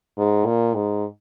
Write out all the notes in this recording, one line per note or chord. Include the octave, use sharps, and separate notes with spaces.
G#2
A#2
G#2